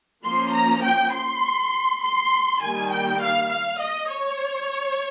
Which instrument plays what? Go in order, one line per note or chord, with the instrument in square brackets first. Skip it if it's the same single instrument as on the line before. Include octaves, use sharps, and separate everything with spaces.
[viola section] F3 A#3 C#4 C6
A#5
G5
C6
C6
D#3 G3 A#3 G#5
G5
F5
F5
D#5
C#5